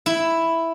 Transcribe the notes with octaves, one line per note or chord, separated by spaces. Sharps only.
E4